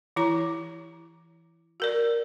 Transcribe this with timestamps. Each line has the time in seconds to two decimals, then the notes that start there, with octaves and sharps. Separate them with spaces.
0.16 E3 E4 A#5
1.80 F#4 A#4 D5